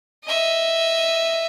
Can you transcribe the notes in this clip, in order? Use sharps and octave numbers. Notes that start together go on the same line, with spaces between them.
D#5 E5